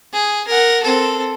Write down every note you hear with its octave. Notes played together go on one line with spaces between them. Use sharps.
G#4
A#4 F#5
C4 A4